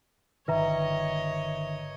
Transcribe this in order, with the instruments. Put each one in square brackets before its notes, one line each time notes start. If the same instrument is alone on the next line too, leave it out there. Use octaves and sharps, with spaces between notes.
[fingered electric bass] G1 D3 D#3 [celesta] B4 E5 A#5 [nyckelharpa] C#5 D#5